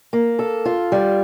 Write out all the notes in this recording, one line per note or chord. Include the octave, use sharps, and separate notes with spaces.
A#3
A4
F4
G3